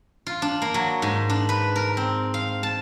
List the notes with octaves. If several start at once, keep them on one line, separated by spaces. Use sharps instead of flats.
F4
D4
A#3
F#3
G#2
D4
B4
A#4
C4
F5
A5